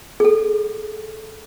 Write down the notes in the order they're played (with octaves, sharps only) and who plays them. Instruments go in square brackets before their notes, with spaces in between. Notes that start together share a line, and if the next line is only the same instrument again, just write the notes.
[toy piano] G#4 A4